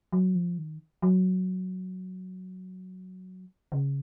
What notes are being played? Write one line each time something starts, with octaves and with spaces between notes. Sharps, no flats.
F#3
F3
D#3
F#3
C#3